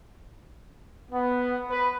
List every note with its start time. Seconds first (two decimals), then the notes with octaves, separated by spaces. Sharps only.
1.12 B3
1.68 B4